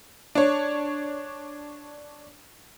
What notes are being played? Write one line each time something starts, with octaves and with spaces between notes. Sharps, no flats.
D4 C#5